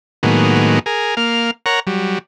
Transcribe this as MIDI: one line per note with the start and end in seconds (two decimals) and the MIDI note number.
0.23 0.79 45
0.23 0.79 51
0.23 0.79 54
0.23 0.79 56
0.23 0.79 58
0.23 0.79 59
0.86 1.15 68
0.86 1.15 70
1.17 1.51 58
1.17 1.51 77
1.66 1.80 70
1.66 1.80 73
1.66 1.80 78
1.66 1.80 82
1.87 2.19 54
1.87 2.19 55